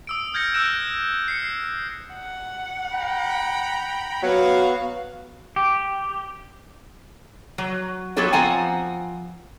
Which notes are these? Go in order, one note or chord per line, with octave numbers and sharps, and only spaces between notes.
D#6 E6 D7
F6 G6 G#6 A#6 C#7
E6 F#6 G6 A#6 D7 E7
C7 C#7
F#5
G5 A#5 B5
F#3 B3 F#4 F5
G4
F#3
F3 F#3 B3 G4 A4 C#5
F3 C4 F#5 G#5 A#5